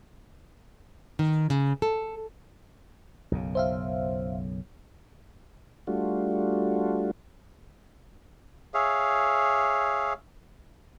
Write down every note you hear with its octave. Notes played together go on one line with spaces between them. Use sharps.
D#3
C#3
A4
B1 F#2 C#3
C5 E5 F5
G3 A3 D4 F4 F#4
G#4 C#5 E5 F5